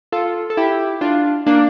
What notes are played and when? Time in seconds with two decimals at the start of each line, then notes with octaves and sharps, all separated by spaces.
0.12 F4 A4
0.50 A4
0.57 E4 G4
1.01 D4 F4
1.46 A#3 D4